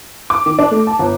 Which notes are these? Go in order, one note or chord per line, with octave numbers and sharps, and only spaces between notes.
D6
D#3
D4
A3
A5
G1